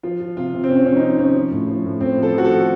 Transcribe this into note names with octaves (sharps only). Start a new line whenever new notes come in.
F3 F4
F3
C3 F4
C3
C4
C3 C#4
F3 C#4
D#4
F3 C#4
F3 C#4
F3
A2
F3
A2
A2 C4
F3 A4
F3 F#4
A4
F3